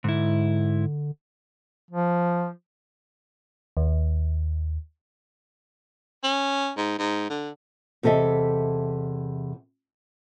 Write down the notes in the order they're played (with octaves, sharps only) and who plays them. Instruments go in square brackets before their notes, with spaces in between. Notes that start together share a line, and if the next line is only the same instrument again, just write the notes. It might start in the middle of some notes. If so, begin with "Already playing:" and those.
[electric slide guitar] G#2 E4 [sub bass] D3
[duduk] F3
[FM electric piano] D#2
[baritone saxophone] C#4
G#2
G#2
D3
[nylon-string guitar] E2 C3 A4 D#5 E5